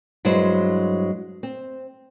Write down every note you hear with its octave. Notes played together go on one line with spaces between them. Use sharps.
G2 F#3 G#3 E4 C5
C4